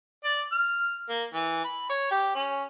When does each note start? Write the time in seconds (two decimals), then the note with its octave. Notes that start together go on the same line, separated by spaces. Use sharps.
0.24 D5
0.52 F6
1.09 A#3
1.34 E3
1.65 B5
1.89 C#5
2.11 G4
2.35 C#4